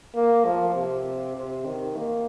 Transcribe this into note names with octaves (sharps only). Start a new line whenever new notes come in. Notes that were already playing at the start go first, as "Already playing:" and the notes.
A#3
F3
C3
C3
D#3
A#3